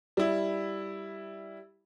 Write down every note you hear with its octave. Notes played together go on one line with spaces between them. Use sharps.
G3 E4